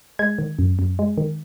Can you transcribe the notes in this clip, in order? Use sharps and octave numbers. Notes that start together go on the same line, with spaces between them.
G#3 G#6
D#3
F#2
F#2
G#3
D#3